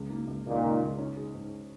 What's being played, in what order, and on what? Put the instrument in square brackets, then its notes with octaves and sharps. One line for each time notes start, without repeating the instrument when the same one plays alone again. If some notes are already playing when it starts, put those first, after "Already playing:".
Already playing: [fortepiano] C#2
A#3
C#2
[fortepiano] C#2 [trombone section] A#2 D#3
[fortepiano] C#2
C#2
C#4
G#3
G#2